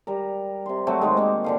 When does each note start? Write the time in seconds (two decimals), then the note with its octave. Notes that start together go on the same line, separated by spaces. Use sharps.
0.07 G3 A#4
0.66 C3 C6
0.87 F#3 A3 C4 F#4
1.02 G#2 D#3 G#3
1.17 A#3 C4
1.44 A#2 D3 F5